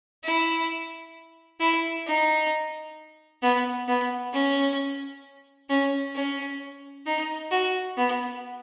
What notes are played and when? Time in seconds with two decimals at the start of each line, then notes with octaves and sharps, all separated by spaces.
0.24 E4
1.60 E4
2.07 D#4
3.42 B3
3.88 B3
4.33 C#4
5.69 C#4
6.15 C#4
7.06 D#4
7.51 F#4
7.97 B3